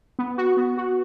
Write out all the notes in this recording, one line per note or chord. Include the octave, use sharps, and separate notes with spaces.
B3
F#4
B3
F#4